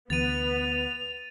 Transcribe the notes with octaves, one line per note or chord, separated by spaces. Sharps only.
D2 E3 B3 A6 D#7 F7